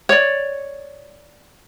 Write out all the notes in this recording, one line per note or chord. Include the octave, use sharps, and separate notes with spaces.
C#5 D5